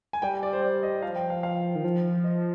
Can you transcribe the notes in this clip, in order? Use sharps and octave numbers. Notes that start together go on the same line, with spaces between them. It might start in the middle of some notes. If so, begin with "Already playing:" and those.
G#5
G3 G5
D5
C5
D5
D#5
F3 F5
G5
F5
F5
D#3
F3
D#5